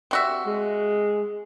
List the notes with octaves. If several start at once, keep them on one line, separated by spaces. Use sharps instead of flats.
C3 F#4 E5
G#3